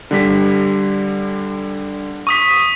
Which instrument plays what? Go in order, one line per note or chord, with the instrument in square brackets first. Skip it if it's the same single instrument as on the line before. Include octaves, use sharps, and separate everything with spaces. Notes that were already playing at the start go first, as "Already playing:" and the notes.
[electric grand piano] D3 G3 B6
[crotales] C#6 D#6 B6